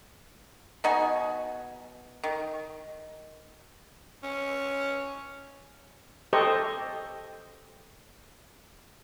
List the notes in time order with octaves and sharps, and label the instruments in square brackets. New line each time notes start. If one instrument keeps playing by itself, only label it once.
[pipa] B2 D#4 F#4 G#5
D#3
[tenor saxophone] C#4
[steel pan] G4 A4 C5 D#5 C#6